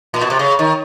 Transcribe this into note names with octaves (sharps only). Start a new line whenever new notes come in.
A#2
B2
C3
C#3
D#3